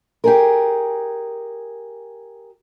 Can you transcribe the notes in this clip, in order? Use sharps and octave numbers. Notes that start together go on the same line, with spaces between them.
G4 G#4 A#4